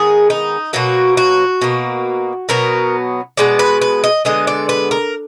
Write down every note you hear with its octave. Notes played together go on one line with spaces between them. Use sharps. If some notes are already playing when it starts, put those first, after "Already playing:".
Already playing: D#3 G#3 B3 G#4
D#4
B2 F#3 A#3 F#4
F#4
B2 A#3
B2 F#3 B3 A#4
B2 G#3 B3 D5
B4
B4
D#5
D3 G#3 B3 D#5
D5
B4
A#4